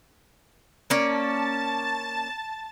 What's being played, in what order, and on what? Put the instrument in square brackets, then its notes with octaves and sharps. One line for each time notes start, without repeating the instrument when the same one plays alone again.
[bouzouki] A#3 C#4 D5 [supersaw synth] A5 A6